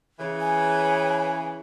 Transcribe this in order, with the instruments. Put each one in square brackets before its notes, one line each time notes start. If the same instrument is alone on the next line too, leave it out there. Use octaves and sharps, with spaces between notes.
[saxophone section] C#3 E3
[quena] G#5